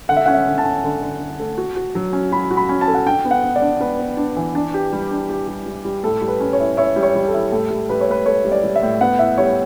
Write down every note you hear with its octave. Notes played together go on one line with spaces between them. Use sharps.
D3 F#5
E5
C#4 F#5
E5
D3
A5
C#4
D3
D3
D3
A3
F#4
F#4
F#3
C#4
F#4 B5
F#4
B5
C#4
A5
A4
F#5
D4 G5
B3
F#5
B3
D5
D4
B3 B4
B3
D4
E3
D4
G4
G3
D4
G4
G3
G3
G3
A2 A4
G3
B4
C#4
C#5
E4
E4 C#5
G3
C#5
G3
A4
E4
A2 A4
G3
G3 B4
C#5
A2 B4
A4 C#5
G3
D5
G3
E5
A2
B3 F#5
E4 E5
G3 C#5